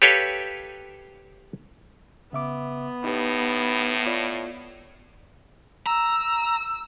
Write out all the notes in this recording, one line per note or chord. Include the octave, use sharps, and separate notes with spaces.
G4 A4 B4 C#5 F5 G5
C#3 B3 E5 D6
A2 D#4 G4 B4
F4 C#5 D5
A#5 E6